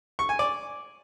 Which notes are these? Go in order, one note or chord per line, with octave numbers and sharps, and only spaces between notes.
C#6
G#5
D5